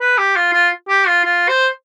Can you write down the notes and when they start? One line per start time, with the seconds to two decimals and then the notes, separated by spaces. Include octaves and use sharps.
0.01 B4
0.18 G4
0.36 F4
0.53 F4
0.89 G4
1.07 F4
1.24 F4
1.49 C5